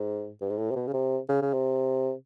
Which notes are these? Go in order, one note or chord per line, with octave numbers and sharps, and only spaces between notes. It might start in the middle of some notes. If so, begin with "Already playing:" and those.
Already playing: G#2
G2
G#2
A2
C3
B2
C#3
C3
C#3
C#3
C3